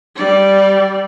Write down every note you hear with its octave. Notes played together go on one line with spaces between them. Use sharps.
G3 D5